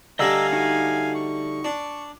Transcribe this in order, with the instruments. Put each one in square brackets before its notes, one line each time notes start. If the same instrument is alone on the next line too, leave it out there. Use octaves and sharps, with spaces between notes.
[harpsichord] D3 G3 A3 [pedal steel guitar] D#5 A#5 E6 [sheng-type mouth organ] F5 G#5
[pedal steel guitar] D#4 F#4
[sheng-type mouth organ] C#6
[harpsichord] D4